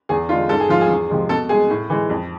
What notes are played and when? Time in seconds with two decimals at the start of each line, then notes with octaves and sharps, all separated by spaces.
0.09 E2 G#4
0.29 D3 G#3 F4
0.49 G#2 A4
0.60 G#4
0.69 F3 G#3 F4
0.81 G#4
0.89 E2
1.10 C3 F3 G#3
1.29 B2 A4
1.49 G#3 G#4
1.70 A2
1.90 E3 G#3
2.10 F2